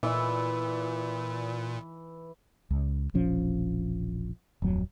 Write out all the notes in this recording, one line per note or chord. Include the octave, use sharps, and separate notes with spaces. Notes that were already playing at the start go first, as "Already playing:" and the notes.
A#2 E3 E5
C#2
E1 A#1 F3 C#4
D1 F2 F#3